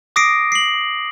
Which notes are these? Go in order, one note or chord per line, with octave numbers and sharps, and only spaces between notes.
D6 D#6 A#6 C7 D7
C7 F#7